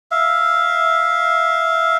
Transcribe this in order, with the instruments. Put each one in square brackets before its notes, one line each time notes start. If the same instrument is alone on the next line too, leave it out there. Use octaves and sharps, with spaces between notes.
[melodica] E5 F5